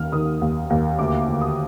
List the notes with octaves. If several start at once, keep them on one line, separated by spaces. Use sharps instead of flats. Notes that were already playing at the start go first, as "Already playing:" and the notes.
Already playing: D#2 D#3 F6
D#3 D#6
D#2
D#2
D2 D6
D2
D#6